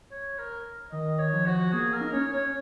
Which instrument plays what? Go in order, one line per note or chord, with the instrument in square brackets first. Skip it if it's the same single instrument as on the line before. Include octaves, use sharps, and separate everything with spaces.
[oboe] C#5
A#4
[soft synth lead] D#3 [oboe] D#5
[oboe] C#5
[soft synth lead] F3
[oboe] F#4
[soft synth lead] A#3 [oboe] G#4
[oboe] A#4
[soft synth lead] D#4
[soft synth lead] C#4 [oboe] C#5
[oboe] C#5